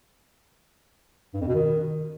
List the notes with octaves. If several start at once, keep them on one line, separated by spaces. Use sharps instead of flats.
G2
F2
B2
D#3